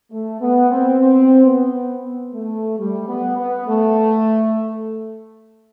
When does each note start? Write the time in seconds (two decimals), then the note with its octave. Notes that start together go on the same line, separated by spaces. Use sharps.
0.12 A3
0.41 B3
0.70 C4
1.00 C4
1.45 B3
2.34 A3
2.79 G3
3.08 B3
3.38 B3
3.68 A3